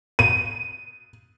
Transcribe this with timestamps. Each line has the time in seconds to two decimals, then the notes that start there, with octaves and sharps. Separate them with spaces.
0.19 D#7